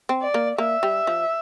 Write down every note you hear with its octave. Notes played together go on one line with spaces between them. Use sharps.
C4
D5
A#3
A#3 E5
G3
F3